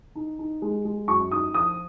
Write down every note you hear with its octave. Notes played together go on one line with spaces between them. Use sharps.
D#4
D#4
G#3
G#3
F#2 C#6
D#4 D#6
F3 D#6